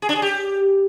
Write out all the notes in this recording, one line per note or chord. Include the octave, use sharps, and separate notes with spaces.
G#4
D4
G#4
G4